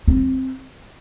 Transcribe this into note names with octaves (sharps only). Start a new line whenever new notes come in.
C4